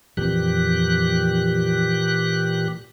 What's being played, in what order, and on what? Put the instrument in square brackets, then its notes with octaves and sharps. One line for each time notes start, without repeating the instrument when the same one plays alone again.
[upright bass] F2 [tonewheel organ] A#2 G4 F#6 [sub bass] E3